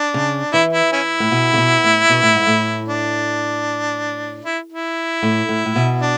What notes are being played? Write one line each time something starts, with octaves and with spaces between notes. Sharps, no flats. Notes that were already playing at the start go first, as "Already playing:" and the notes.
Already playing: D4
C#3
E3 E4
E4
C#4 E4
A2
B2
C#3
B2
A2
B2
A2
G#2
A2
D4
E4
E4
A2
A2
A2
B2
D4